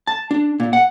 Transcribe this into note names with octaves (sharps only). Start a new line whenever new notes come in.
A5
D4
A#2
F#5